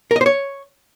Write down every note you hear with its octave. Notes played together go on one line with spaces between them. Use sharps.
A#4
D#5
C5
C#5